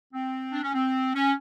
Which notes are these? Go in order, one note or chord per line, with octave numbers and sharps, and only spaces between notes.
C4
D4
C#4
C4
C#4